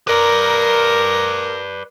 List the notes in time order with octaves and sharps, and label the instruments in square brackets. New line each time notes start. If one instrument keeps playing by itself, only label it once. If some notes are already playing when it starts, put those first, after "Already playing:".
[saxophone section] A#4 [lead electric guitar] B4 D5